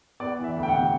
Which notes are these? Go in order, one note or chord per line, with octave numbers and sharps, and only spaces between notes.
B3 D5
E3
E5
D2
G5
F#5
C3